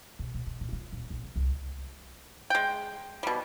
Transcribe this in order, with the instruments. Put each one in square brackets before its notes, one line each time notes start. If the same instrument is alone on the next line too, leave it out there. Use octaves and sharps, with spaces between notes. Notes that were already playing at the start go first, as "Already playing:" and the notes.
[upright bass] B2
A#2
B2
A#2
F4
D#1
A#1
C3
C2
[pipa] G#3 G5
B2 G3